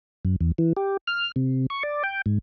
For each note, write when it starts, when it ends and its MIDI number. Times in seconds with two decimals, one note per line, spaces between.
0.25 0.36 42
0.41 0.52 40
0.58 0.73 52
0.77 0.97 67
1.07 1.32 89
1.36 1.66 48
1.70 1.83 85
1.83 2.03 74
2.04 2.22 79
2.26 2.38 44